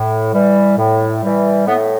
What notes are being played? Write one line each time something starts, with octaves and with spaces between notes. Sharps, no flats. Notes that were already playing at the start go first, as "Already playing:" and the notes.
Already playing: A2
E3 G3
A2
E3 G3
A2 B3